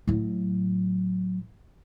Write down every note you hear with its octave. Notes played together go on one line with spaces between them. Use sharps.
A2 F#3